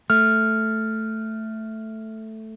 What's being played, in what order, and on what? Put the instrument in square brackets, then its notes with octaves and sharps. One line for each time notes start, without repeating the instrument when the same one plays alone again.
[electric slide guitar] A3 [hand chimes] F6